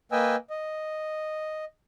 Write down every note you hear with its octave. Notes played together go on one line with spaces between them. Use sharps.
A#3 B4 D#5 G5 G#5 E6
D#5